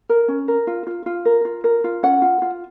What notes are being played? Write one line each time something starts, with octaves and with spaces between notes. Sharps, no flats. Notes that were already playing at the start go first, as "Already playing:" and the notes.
A#4
C#4
A#4
F4
F4
F4
A#4
F4
A#4
F4
C#4 F#5
F4
F4